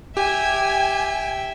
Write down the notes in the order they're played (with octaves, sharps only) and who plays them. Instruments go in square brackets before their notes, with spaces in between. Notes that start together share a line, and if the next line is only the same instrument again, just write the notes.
[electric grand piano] G4 [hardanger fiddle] E5 G5 [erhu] G#5